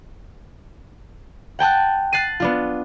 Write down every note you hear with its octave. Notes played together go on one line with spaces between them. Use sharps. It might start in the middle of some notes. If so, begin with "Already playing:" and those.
F#5 G5 A5 F#6
F#6 A6 C7 D#7
B3 D4 F4